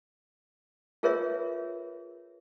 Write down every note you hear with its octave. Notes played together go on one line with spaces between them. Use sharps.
F4 G#4 A#4 B4 C#5 E5